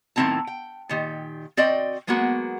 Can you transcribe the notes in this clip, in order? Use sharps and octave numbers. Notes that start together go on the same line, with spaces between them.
A2 D#3 F#3 C4 E4 A5
G5
A#2 D#3 G4
C4 F#4 D5 D#5 G5
F#3 G#3 A#3 B3 F#4